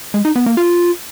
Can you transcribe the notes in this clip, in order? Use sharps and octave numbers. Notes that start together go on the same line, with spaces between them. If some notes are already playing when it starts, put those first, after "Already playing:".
G#3
D#4
B3
A#3
F4